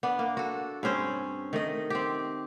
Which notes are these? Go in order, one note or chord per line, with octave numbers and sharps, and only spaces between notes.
B3 D4
A#3
F#4 A4
G2 C4 C#4 C5
D#3 A3 D#5
C4 G4